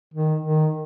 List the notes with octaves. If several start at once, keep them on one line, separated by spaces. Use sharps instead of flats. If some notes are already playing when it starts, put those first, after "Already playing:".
D#3
D#3